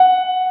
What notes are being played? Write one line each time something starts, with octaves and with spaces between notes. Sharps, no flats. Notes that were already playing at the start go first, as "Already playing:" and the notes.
Already playing: F#5